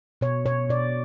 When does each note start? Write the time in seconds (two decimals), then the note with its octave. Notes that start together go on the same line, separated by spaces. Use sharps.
0.21 B2 C#5
0.45 B2 C#5
0.69 B2 D5